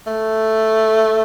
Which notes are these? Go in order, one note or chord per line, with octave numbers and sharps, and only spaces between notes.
A3